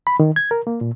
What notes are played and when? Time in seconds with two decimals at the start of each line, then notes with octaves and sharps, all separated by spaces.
0.07 B5
0.20 D#3
0.36 G#6
0.51 A#4
0.67 A#3
0.81 A#2